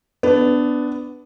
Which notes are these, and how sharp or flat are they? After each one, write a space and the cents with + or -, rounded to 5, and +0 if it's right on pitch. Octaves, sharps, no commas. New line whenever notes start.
B3 +15 D4 +0